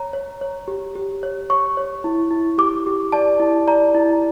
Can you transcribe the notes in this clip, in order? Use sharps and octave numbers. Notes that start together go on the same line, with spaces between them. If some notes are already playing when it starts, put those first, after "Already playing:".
Already playing: C#5 A#5
C#5
C#5
G4
G4
C#5
C#5 C#6
C#5
E4
E4
G4 D6
G4
D5 A5
E4
D5 A#5
E4